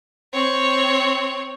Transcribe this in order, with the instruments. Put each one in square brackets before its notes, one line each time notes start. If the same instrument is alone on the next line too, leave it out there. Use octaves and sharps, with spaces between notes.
[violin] C4 C#5